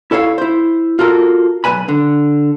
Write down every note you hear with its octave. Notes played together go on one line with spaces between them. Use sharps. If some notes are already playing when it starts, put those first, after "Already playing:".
E4 A4 C#5 E5 F5
E4 C5
F4 F#4 A4 A#4
B1 A3 B4 G#5 B5
D3